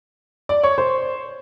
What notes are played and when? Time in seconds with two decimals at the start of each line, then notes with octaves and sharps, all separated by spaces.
0.49 D5
0.64 C#5
0.78 C5